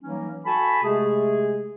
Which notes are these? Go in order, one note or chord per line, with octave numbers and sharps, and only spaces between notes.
E3 F#3 G3 A#3 C#4 D#4
F#4 A4 G#5 A5 B5
C3 G#3 A3 G#4